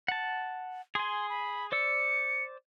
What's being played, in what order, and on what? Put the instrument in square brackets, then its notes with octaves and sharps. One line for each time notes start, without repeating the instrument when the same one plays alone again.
[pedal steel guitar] F#5 A5
[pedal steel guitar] G#4 G#5 [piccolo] C6
[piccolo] B5
[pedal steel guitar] C5 D5 E6 [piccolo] C#7